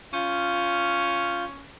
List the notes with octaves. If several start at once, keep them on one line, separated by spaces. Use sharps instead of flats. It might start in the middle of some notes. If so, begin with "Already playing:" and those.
C#4 F4 G6